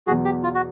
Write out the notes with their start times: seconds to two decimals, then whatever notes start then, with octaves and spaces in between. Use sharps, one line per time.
0.07 E2 B2 F#3 F#4 G#4
0.25 G4
0.43 F4
0.55 F#4